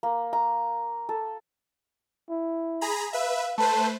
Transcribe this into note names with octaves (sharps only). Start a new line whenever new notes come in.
A#3
A#5
A4
E4
G#4 A#5 B5
B4 E5 F5
A3 B4 C5 A5